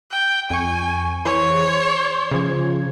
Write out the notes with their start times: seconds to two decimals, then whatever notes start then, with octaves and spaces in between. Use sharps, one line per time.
0.11 G5
0.50 F2 G#5 C#6
1.25 E3 G#4 C5 C#5
1.67 C6
2.31 C#3 F3 G#6